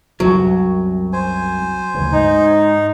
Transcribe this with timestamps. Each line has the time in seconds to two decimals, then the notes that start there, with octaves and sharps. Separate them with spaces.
0.20 C2 F#2 C3 F#3
1.13 C5 G#5
1.94 D2 C#3 E3
2.12 G#2 D#4